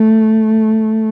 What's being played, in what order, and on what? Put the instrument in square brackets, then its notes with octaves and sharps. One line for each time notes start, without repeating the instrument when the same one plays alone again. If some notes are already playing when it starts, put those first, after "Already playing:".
Already playing: [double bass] A3